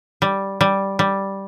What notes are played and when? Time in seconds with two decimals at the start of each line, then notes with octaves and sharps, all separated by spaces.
0.22 G3
0.61 G3
0.99 G3